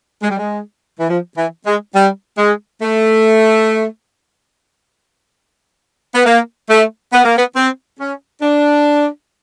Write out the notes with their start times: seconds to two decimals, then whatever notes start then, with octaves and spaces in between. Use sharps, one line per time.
0.23 G#3
0.31 G3
0.38 G#3
1.00 E3
1.10 F3
1.37 E3
1.66 G#3
1.95 G3
2.38 G#3
2.82 A3
6.14 B3
6.26 A#3
6.70 A3
7.13 B3
7.25 A#3
7.38 B3
7.56 C4
7.99 C#4
8.42 D4